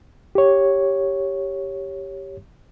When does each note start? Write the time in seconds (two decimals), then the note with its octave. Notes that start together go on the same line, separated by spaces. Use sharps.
0.35 G4 C#5